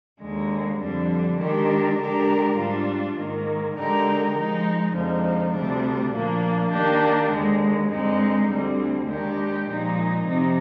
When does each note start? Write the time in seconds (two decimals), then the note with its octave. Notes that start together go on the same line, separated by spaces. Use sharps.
0.21 D#2 D3 G#3
0.80 F2 D3 G3 D4
1.39 D#3 G#3 D4 G4 A#4
1.99 D3 G#3 D4 G4 A#4
2.57 G#2 G3 D4 F4
3.17 G#2 D#3 A#3
3.76 D3 G#3 D#4 G4 A#4
4.35 F3 G#3 D#4
4.94 F2 D3 F3 G#3 D#4
5.53 D2 C3 G3 D4
6.13 A#2 F3 A#3 D4
6.72 D#3 A#3 D4 G4
7.31 D#2 D3 G#3
7.90 G2 D3 G#3 C4 D#4
8.49 D2 D3 G3 C4
9.08 D#2 D#3 G#3 D4 G4
9.68 A#2 F3 G#3 D#4
10.27 C3 F3 C4 D#4